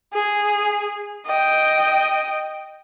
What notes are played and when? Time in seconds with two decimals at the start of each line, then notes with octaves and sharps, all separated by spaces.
0.13 G#4
1.26 D#5 G5